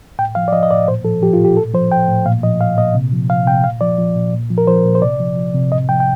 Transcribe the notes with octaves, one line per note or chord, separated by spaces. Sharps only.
A2 G5
F3 F5
D5
F3 D#5
D#5
A2 D5
A#2 C5
F3 A4
F3 G4
F4
A#2 G4
A2 A4
F3 C5
F3 G5
A2
A#2 F5
F3 D#5
F3 F5
A#2 D#5
C3
F3
F3 F5
C3 G5
A#2 F5
F3 D5
F3
A#2
A#2
F3
A#4
F3 C5
A#2
C5
C3 D5
F3
F3
C3
A2 D#5
F3 G5
G5